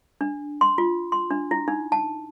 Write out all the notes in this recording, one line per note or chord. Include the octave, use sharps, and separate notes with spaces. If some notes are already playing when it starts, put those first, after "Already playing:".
D4
C6
F4
C6
D4
E4
D#4
A5